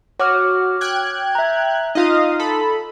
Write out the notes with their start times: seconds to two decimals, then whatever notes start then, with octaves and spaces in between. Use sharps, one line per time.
0.20 F#4 C#5 D6 F6
0.81 G5 F#6 G#6
1.35 E5 A#5
1.95 D#4 F4 D#5 F5 D#6
2.40 A4 B5